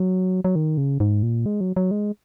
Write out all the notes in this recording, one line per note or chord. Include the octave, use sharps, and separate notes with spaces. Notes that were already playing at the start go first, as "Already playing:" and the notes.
Already playing: F#3
F#3
D#3
C#3
G#2
A#2
G#3
F#3
F#3
G#3